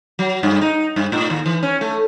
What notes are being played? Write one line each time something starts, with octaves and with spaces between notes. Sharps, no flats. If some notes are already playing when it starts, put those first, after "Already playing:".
F#3
G2
D#4
G2
A2
D#2
E3
C#4
A3